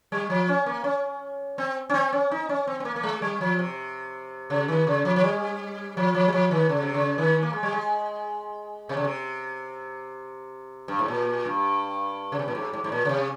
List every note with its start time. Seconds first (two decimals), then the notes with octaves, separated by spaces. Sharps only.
0.12 G3
0.30 F3
0.48 C#4
0.66 A#3
0.84 C#4
1.58 C4
1.90 C#4
1.94 C4
2.13 C#4
2.31 D#4
2.49 C#4
2.67 C4
2.80 C4
2.85 A#3
2.96 A#3
3.03 G#3
3.22 G3
3.41 F3
3.59 C3
4.50 C#3
4.68 D#3
4.87 C#3
5.05 F3
5.16 F3
5.24 G3
5.97 F3
6.15 F3
6.28 G3
6.33 F3
6.51 D#3
6.69 C#3
6.82 C3
6.94 C#3
7.18 D#3
7.43 A#3
7.53 G#3
7.63 G3
7.73 G#3
8.89 C3
8.97 C#3
9.05 C3
10.88 G2
10.99 G#2
11.08 A#2
11.45 G2
12.32 C#3
12.39 C3
12.48 A#2
12.55 G#2
12.73 G#2
12.84 G#2
12.92 A#2
13.05 C#3
13.09 C3